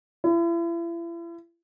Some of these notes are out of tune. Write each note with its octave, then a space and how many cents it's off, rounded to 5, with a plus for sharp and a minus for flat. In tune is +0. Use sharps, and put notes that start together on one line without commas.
E4 +40